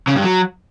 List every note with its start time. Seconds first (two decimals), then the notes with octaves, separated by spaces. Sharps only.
0.07 C#3
0.16 G2
0.24 F#3